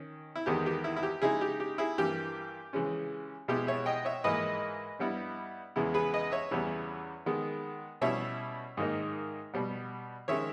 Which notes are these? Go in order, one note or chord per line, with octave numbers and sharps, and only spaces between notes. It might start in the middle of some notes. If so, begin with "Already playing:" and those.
Already playing: D#3 C#4
E4
E2 D#3 G#3 B3 G4
G4
E4
E4
G4
C#3 G#3 D#4 E4 G#4
G4
G4
E4 G#4
G2 E3 A#3 G4
C#3 E3 G#3 C#4
B2 G#3 B3 E4 G4
C#5 E5
D#5 G5
C#5 E5
G#2 E3 A#3 E4 B4 D#5
G2 G3 B3 E4
E2 C#3 G#3 B3 E4
G#4 B4
B4 D#5
C#5 E5
E2 C#3 E3 G3 B3
D#3 G#3 B3
B2 G3 C#4 E4 C#5 E5
G#2 D#3 A#3 D#4
B2 G3 B3
D#3 G#3 C#4 C#5 E5